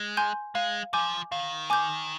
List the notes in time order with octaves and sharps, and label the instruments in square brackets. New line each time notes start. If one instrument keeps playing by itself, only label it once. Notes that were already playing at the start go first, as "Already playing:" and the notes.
Already playing: [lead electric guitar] G#3
[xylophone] G#5 C6 G6
[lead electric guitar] G#3 [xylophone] F5
[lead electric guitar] F3 [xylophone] G#5 D6 G6
[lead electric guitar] D#3 [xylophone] F5
[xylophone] G#5 D6 G6